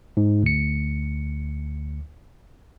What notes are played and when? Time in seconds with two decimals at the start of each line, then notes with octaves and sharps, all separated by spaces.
0.17 G#2
0.43 D2 C#7